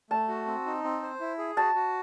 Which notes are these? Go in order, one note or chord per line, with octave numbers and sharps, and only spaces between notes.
A3 A5
F#4
C4
D#4
C4
C5
E4
G#4
F#4 A5
F#4